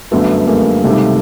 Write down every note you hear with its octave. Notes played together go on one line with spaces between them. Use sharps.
G1 F#2 D3 F#3 A3 B3
G#3 A#3
C#2 C3 D#3 G3 A3